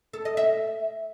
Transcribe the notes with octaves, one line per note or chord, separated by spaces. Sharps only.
A4
D#5
E5